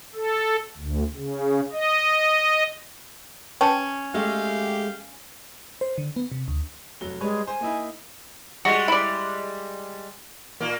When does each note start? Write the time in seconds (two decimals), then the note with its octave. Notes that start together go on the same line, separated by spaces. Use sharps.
0.15 A4
0.77 D2
1.14 C#3
1.72 D#5
3.61 C#4 B4 G5 A5
4.14 G#3 A3 G4 G#4 F5
5.81 C5
5.98 D3
6.16 B3
6.32 C3
6.48 D2
7.01 F1 F#3 G7
7.21 G3 G#3 B4 C#5
7.47 C5 G#5
7.61 A#3 D#4 E4
8.65 G3 G#3 F#4
8.88 E4 D5
10.61 A#2 A#3